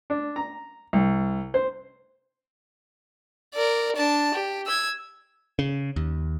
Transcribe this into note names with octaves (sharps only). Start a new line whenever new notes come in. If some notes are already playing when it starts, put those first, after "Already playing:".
D4
A#5
C2
C5
A#4 D5
D4 A5
G4
E6 G#6
C#3
D#2